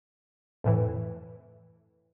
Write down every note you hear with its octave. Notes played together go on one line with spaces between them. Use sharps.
F2 A2 E3